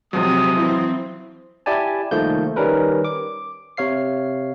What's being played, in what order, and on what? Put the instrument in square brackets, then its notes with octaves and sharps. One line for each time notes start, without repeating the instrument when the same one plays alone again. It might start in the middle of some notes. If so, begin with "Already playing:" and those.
[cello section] C3 [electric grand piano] F3 F#3 [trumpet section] G#3 D#6
[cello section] E3 C4 [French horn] E4
[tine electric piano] E4 G4 D5 G#5 A5
C2 D#3 F3 A3 A#3 G6
D#3 G3 C#4 A#4 B4
D6
C3 C#5 F5 C7